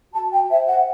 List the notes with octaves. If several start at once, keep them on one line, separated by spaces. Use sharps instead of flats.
F#4 A5
G5
C5 E5
F#5